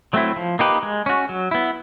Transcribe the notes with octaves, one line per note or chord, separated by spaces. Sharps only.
F#3 A3 C4 E4
F3
A#3 D#4 G4 B4
G#3
C#4 F#4
F#3
B3 E4